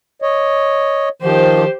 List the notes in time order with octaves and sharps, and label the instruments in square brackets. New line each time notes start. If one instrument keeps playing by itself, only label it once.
[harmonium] C#5 D#5
[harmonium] D#3 F3 [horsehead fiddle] G4 C5